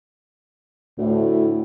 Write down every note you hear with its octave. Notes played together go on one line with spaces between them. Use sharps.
D2 A2